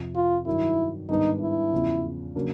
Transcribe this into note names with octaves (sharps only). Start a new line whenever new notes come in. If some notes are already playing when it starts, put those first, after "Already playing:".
Already playing: F2 C3 F3
F4
G2 D#3 F#3 E4
G#2 D#3 G3 B3 D4 D#4
E4
E2 C#3 F3
C#3 F#3 A#3 D4